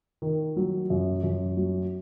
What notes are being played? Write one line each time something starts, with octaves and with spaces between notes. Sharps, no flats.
D#3
F#3
F#2
F#2
F#3